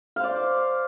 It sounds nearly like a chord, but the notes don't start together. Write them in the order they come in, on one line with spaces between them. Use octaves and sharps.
F5 C5 D5